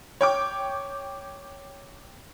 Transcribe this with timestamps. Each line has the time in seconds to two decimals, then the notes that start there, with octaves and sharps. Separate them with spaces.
0.21 C#5 G5 D6